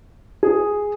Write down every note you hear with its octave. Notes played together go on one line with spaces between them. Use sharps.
G#4